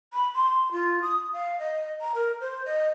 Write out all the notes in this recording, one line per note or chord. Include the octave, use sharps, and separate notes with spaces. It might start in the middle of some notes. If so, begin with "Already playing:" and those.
B5
C6
F4
D#6
F5
D#5
A#5
A#4
C5
D#5